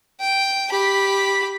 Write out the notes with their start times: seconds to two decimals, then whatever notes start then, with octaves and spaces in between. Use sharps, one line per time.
0.20 G5
0.69 G4 B5